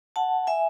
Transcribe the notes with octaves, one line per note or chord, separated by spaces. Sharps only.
F#5 A5
E5 G#5